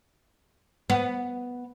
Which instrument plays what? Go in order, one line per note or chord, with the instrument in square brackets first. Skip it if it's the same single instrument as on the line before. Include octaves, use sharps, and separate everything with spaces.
[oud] B3